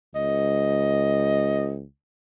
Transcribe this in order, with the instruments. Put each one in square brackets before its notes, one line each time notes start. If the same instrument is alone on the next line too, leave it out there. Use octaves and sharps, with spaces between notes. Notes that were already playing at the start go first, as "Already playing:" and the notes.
[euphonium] C#2 [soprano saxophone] D#5